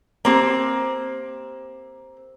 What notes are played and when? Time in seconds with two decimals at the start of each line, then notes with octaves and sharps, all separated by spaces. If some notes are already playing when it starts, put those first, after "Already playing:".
0.25 A#3 C4 G4